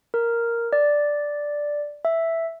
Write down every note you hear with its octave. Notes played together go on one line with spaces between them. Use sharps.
A#4
D5
E5